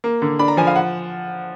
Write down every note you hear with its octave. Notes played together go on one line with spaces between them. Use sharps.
A#3
D3
D4 B5
A#5
F3 G#5
F5
F#5